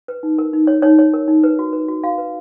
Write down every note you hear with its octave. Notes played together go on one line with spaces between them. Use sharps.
B4
D#4
A#4
D#4
C#5
D#4 C#5
C#5
A#4
D#4
B4
F#4
B4
F#4
F#4 F5
B4